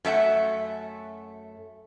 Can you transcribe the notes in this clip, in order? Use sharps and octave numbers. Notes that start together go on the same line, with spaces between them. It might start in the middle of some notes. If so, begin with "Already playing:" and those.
F#2 A3 E5 F#5